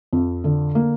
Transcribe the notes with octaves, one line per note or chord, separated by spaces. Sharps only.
F2
D3
A#3